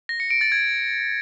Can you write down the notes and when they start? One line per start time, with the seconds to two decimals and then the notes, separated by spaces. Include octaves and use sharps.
0.09 A#6
0.20 C#7
0.30 D7
0.41 A6
0.52 G#6